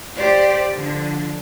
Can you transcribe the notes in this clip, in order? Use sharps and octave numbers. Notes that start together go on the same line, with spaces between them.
G4 C5 D5
D3 F3